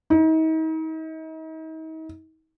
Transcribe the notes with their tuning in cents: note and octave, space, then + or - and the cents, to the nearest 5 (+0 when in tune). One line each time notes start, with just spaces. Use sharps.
D#4 +40